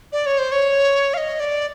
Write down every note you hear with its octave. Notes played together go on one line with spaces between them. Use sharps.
D5
C#5
C5
C#5
F5
D#5
D5